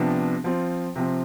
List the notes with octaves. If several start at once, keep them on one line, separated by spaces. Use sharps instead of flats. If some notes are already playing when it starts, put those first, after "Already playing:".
Already playing: C3 F3 B3 D4
F3 C4 F4
C3 F3 C4